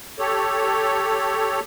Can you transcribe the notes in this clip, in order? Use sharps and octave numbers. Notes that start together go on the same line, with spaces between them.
G4 A4 C#5